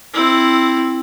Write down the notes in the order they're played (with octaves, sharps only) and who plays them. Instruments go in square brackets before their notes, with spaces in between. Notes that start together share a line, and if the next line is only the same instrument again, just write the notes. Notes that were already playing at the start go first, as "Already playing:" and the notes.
[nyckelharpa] C4 E4